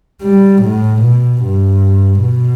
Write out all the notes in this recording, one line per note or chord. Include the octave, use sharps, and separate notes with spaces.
G3
A2
B2
G2
B2